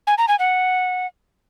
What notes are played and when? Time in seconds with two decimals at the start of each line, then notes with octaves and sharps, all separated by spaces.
0.07 G#5
0.18 A#5
0.28 G#5
0.39 F#5